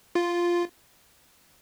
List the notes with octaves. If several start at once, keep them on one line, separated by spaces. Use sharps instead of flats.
F4